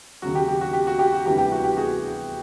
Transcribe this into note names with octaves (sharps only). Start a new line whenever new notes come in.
D#2 C#3 F#3 F#4
G4
G4
F#4
G4
F#4
G4
F#4
E1 D2 C3 E3 G3 G4
G4
F#4
G4
F#4 G#4